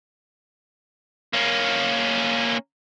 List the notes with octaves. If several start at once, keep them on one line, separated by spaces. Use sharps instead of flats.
A#3 C#4